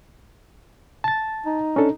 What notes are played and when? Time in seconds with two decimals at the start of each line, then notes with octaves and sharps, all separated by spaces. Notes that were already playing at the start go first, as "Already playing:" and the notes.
1.04 A5 A6
1.46 D#4
1.76 C#4 D4 A4